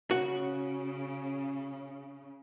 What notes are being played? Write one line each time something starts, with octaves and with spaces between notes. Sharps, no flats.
C#3 F#4